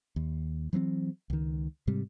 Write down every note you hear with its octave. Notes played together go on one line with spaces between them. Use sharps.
D#2
E3 F#3 B3 C4
C#2 D#3
G#2 C3 G3